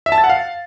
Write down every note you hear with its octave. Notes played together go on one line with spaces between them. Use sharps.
E5
A5
A6
F#5
F5